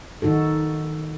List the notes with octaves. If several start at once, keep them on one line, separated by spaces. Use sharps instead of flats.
D#3 D#4 F#4 A4